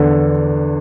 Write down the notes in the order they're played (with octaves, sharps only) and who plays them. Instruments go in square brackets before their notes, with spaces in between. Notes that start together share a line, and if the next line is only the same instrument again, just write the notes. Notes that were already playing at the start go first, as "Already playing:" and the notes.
Already playing: [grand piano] E2 D3